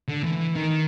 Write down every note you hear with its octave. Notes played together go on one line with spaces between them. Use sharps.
D3
E3
D#3